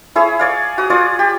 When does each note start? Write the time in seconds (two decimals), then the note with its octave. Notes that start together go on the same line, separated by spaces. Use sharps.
0.16 E4 G#4 C#5
0.39 C#5 D5 F5
0.78 F#4 D#6
0.90 F4 C#5 D5 D#6
1.19 G4